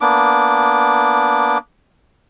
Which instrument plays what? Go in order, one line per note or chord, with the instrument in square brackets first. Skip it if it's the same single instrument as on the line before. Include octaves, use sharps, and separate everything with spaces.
[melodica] A#3 B3 D4 D6